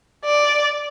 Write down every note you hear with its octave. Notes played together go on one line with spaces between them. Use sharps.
D5